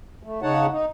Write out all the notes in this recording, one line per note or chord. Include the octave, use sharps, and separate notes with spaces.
A3
C#3 D#4 C#5 F#5 A5
D#4